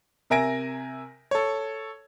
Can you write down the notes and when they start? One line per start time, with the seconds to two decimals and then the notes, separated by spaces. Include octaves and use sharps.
0.30 C3 A#4 E5 G#5 A#6 D7
1.31 A4 C#5